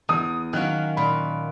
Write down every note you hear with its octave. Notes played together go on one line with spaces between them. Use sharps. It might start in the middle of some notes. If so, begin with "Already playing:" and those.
E2 D#6
D#3 F#3 A#3 C#4 F#6
A#2 B5